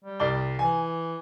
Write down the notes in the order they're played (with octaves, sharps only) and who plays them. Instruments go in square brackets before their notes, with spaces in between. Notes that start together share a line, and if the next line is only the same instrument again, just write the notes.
[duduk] G3
[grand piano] C2 D5 G7
[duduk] E3 [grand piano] G#5